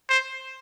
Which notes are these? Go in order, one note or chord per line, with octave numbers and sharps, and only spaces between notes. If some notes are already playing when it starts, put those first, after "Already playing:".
C5